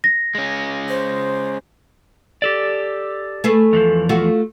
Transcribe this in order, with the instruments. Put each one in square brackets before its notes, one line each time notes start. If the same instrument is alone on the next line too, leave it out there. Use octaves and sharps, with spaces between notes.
[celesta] A#6
[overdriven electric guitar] G#3 C#4
[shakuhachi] C5
[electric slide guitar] G4 A4 D5
[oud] A3 G#4 B4
[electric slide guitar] E2 E3 F3
[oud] A3 F4 F#4